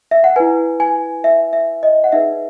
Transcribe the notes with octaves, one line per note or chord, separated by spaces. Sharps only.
E5
F#5
E4 B4 G#5
G#5
E5
E5
D#5
F#5
D#4 G#4 B4 E5